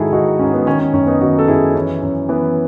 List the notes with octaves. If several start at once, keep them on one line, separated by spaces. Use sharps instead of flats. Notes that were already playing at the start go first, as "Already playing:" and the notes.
Already playing: G#2 D#3 E4 F#4 G#4 A4
D#3 D#4 F#4
G#2 C#4
B3
D#3 C#4
C#4
F#2 C#4
B3 D#4
D#3 D#4 F#4
A4
F#2 E4 G#4
E3 C#4
F#2
E3 B3